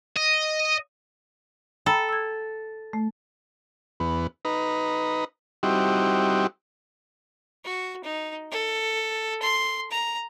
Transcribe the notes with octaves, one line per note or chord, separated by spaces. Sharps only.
D#5
A4 G5 A#5 B5
E6 G#6
A3
E2 B3
D#4 B4 A#5
G3 C4 D#4 E4 F#4 G4
F#4
D#4
A4
C6
A#5